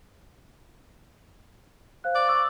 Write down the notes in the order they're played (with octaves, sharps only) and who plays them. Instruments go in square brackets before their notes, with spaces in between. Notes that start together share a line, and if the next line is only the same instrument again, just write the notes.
[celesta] C5 F5 F#6
[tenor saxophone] D5
[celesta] C#6 E6 A6